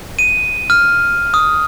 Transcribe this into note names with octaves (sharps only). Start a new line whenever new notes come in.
D#7
F6
D#6